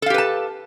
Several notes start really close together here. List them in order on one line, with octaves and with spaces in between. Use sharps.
A4 F5 G4 B4 A5